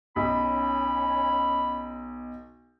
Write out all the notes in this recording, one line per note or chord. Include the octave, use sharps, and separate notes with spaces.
B1 C#4 B5